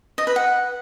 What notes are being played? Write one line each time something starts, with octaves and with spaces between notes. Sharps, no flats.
D#5
B4
F#5